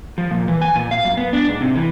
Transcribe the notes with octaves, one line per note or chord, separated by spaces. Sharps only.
F3
A#2
E3
G#5
A#2
F5
F#2
B3
D4
G#2
C3
E3